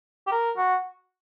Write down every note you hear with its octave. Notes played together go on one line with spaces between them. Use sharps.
G4
A#4
F#4